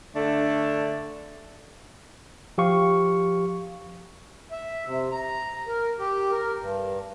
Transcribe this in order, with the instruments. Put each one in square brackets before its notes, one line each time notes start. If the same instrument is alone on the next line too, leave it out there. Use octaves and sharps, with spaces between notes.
[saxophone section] D3 A3 D4
[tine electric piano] F3 G4 F5 C#6
[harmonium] E5
C3
A#5
A#4
G4
A#4
G2